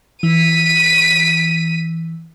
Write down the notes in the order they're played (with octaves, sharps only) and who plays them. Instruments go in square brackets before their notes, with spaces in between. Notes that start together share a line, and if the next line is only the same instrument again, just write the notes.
[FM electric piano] E3 [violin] B6 D#7